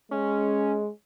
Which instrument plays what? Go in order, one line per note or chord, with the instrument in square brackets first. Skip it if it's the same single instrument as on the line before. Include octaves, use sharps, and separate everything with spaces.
[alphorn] G#3 [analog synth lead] C#4